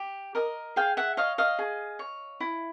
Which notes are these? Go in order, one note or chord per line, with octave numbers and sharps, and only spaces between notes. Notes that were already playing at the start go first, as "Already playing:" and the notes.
Already playing: G4
A#4 D#5
G#4 F5 G5
E5 F#5
C#5 D#5 F5
D#5 F5
G#4
C#5
E4